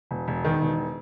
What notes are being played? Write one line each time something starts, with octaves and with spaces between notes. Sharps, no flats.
E1
E1
D#3
E1